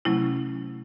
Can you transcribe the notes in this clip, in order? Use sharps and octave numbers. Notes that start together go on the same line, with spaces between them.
C3 F#3 A3 C#4 E4